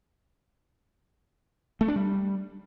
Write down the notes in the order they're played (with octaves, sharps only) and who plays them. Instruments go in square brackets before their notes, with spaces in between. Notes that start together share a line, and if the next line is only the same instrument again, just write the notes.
[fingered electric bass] A3
D4
G3